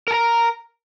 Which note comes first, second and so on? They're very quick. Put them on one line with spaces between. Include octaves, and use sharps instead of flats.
A#4 A5 A#5